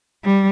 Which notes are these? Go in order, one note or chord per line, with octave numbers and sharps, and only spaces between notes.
G3